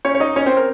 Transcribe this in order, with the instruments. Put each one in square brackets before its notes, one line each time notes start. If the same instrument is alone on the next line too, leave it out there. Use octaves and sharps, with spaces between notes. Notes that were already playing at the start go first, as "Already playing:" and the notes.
[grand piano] C#4 C#5
C#5
D#4 D#5
C#4 C#5
C4 C5
A#4